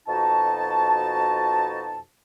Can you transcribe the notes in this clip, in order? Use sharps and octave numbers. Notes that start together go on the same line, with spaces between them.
F2 B2 D#4 F#4 A5